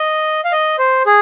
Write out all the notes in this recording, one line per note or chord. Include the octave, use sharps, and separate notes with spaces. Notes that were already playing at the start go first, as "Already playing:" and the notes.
Already playing: D#5
F5
D#5
C5
G#4